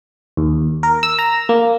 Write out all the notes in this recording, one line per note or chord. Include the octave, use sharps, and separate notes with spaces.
D#2
A#4
E6
A#5
A#3